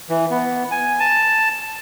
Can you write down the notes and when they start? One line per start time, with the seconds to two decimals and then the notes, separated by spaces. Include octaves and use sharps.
0.10 E3
0.30 B3
0.71 G#5
1.00 A5